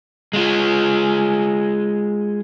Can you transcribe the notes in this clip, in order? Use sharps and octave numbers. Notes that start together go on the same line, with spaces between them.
G#3 F4